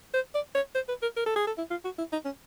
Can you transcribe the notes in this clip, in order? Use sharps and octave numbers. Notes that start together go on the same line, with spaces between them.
C5
D5
C#5
C5
B4
A#4
A#4
A4
G#4
A4
E4
F4
F#4
E4
D#4
C#4